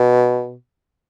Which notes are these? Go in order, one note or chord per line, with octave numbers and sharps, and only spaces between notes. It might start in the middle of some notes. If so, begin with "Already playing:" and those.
Already playing: B2